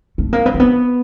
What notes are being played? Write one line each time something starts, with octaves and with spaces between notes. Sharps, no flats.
A3
A#3
B3
A#3
B3